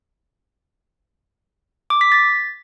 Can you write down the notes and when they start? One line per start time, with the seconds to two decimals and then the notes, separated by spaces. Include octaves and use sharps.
1.90 D6
2.01 B6
2.12 A6